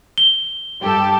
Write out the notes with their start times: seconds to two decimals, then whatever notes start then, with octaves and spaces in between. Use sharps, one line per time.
0.18 G7
0.80 G2 G4 A4